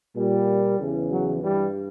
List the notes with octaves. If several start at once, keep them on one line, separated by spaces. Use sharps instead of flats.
A#2 G3
E2 C#3 E3
F#3
G2 E3 G3